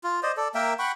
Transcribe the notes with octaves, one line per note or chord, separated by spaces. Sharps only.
F4
C5 D5 D#5
A4 D5
A#3 A#4 E5 G5
F#5 G5 B5 C#6